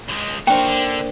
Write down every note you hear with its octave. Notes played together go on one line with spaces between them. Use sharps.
C#2 G#3
A#3 D4 F#4 A#4 C5 G5
D3